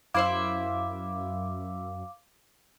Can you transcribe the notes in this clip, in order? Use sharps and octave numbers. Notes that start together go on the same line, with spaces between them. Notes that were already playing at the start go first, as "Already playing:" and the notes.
F#2 E4 C5 E5 F5 D6